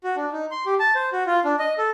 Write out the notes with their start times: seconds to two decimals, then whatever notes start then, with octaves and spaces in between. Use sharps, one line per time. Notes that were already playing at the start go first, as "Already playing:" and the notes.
0.04 F#4
0.16 D4
0.32 D#4
0.51 C6
0.66 G4
0.80 A5
0.95 C5
1.13 F#4
1.27 F4
1.45 D4
1.59 D#5
1.78 A4